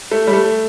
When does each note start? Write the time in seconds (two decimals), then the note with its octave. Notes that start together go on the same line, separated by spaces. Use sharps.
0.12 A3
0.27 G3
0.33 A3